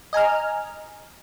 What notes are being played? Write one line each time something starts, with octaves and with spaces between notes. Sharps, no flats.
D#5 G#5 A#5 F6